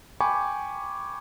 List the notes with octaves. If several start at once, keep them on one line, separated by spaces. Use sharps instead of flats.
G5 G#5 B5 C#6 D6